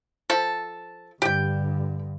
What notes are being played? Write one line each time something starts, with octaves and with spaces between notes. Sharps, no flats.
F3 A4
G2 D3 G4 G5